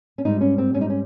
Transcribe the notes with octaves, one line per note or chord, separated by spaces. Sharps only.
C#4
G#2 G3 D#4
C#4
C4
G#2 G3 C#4
D#4
C#4